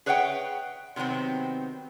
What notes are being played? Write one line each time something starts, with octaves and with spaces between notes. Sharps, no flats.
G#4 B4 C#5 E5 F#5 G5
C3 D#3 F#3 B3 C4